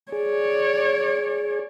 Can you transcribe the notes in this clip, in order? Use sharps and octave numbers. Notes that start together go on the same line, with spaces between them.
G#4 C#5 D5